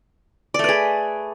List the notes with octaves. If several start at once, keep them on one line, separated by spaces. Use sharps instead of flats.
A3 G#4 B4 D5